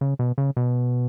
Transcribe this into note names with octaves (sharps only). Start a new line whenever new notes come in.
C#3
B2
C#3
B2